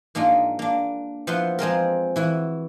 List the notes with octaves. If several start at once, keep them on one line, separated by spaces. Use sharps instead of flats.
G#2 A#3 D4 D#4 F4
A#3 D4
F3 B3 E4 F#5 C6
F3 G#3 C4 A#4
E3 E4 F#4